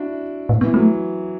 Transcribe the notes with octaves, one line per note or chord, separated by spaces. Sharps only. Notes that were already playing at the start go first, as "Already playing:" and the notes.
Already playing: D4 E4 F#4
A2
E3 B3
F#3 A3